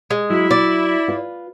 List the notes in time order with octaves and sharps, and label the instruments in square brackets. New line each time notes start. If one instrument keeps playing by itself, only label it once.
[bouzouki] G#3
[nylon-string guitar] F#3 [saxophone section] E4
[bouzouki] D5
[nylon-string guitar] F4 B4